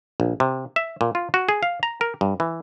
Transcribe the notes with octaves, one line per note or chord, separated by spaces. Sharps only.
A#1
C3
E5
A#2
F4
F#4
G#4
F5
A#5
A#4
G2
E3